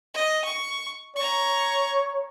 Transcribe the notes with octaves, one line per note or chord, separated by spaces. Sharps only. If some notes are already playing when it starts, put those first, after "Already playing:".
D#5
C#6
C#5 A#5 C#6